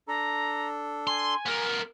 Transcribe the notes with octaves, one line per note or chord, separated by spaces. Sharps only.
D4 A4 A#5
G#5 C6
B3 A#4